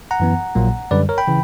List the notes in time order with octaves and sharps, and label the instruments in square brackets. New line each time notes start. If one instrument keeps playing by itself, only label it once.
[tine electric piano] F#5 A#5
F#2 E3 B3
A#1 A#2 F#3 A#3
F#2 D3 G3 B4 D5
A#4 C#5
G5 B5
C#3 E3